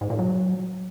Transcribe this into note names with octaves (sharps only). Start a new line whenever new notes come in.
G#2
A#2
F#3